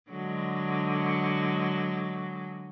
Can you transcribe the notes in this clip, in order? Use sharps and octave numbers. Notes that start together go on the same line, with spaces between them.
D3 F#3 G#3